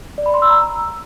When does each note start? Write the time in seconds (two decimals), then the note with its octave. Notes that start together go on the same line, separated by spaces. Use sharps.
0.18 D5
0.26 B5
0.34 C6
0.42 E6
0.50 A#5